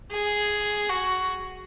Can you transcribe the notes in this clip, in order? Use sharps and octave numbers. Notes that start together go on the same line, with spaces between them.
G#4
F#4